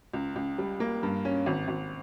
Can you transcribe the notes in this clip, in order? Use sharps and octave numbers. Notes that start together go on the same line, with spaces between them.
C#2
C#2
G3
A#3
G2
C#4
G#1
G#1